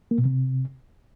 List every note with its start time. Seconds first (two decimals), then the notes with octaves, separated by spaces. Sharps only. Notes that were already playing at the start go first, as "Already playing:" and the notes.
0.11 A#3
0.18 B2
0.25 C3